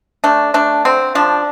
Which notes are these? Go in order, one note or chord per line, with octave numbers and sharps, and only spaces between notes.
A3 D4
A3 D4
D3 C4
F3 D4